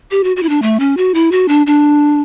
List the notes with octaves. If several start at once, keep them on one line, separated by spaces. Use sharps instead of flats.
G4
F#4
F#4
E4
D4
A3
C#4
F#4
E4
F#4
D4
D4